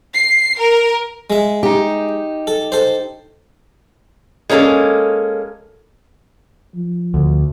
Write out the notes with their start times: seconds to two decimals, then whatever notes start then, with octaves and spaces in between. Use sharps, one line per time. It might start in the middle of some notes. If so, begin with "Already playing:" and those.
0.15 C7
0.59 A#4
1.30 G#3 E5
1.63 D#4 G4
2.47 A4
2.72 A4 C5
4.50 G#3 A#3 C#4 D#4 A4
6.75 F3
7.14 D2